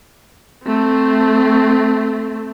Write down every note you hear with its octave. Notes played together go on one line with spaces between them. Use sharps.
A3 C4